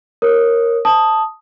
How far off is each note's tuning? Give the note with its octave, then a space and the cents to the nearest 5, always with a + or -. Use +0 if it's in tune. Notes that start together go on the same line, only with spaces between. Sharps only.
A#4 +0 C#5 -20 D#6 +0
A5 +0 D#6 +0